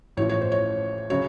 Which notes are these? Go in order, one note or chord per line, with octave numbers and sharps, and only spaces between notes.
A1 A2 F3 C#5
C#5
C5
C#5
C#3 F#3 C#5